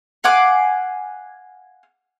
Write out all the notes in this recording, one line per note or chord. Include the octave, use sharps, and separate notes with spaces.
F5 F#5 G#5 D6